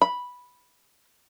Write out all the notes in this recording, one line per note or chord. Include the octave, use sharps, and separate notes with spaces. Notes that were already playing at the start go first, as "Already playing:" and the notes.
B5